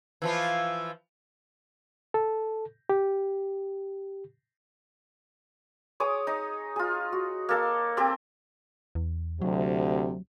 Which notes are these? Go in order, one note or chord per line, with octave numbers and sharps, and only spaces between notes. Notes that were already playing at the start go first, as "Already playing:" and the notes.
E3 F3 F4
A4
G4
G#4 C#5 D6 D#6
D#4
F4 G#4
F#4
A#3 A4 F5
C4 G4 A4
E2
D2 C3 F#3